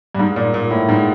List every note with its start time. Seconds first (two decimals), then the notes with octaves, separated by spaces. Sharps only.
0.15 G2
0.19 G#2
0.36 A#2
0.54 A#2
0.71 A2
0.89 G#2